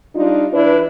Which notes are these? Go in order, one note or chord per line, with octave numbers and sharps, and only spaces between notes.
G3 D4 D#4 F4
E3 D4 E4 B4